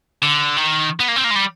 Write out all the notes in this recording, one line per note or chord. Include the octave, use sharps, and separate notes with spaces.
D3
D#3
B3
A#3
C4
A#3
G#3
G3